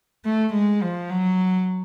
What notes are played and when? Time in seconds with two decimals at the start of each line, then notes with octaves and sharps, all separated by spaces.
0.25 A3
0.54 G#3
0.82 F3
1.10 F#3